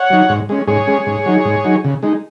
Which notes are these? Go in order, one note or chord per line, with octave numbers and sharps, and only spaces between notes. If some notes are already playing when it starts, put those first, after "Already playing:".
Already playing: C#5 F#5
F#3 D#4
G#2
G#3 C#4
G#2 G#4 C#5
G#3 C#4
G#2
F#3 D#4
G#2
F#3 D#4
C#3
G#3 D#4